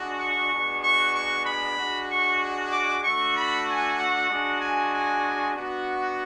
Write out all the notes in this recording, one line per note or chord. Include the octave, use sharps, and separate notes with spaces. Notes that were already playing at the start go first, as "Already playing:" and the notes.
Already playing: G#3 D4 F#4
C#6
G#3 B3 D4 F#4
C#6
C#6
B5
G#3 D4 F#4
C#6
D6
A3 D4 F#4 C#6
B5
G#5
F#5
G#3 D4 F#4
G#5
G#5
B3 D4 F#4